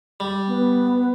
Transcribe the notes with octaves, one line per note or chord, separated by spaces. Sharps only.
G3
B3